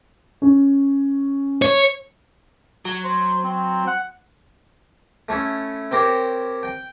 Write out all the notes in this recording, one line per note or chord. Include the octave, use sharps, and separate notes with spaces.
C#4
C#5
F#3
C5
C4
F#5
A3 C#4 E4
C4 G4 A#4 C5 C#5
G5